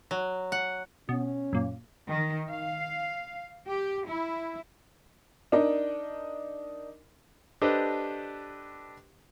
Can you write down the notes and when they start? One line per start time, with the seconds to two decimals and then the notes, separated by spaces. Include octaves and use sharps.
0.11 F#3
0.52 F#5
1.09 B2 C#4
1.53 F#2 A#2
2.09 D#3
2.52 F5
3.65 G4
4.06 E4
5.52 D4 D#4 A#4 D#5
7.62 D4 G4 A4 B4 C5 D#5